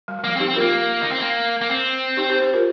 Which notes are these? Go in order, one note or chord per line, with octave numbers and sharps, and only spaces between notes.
G3
G3
F3 A#3
C4
D#4 G4
C4
A#3 F4 A#4
D#4
C4
A#3
A#3
C4
D#4 G4
G4 C5
G4 C5
F4 A#4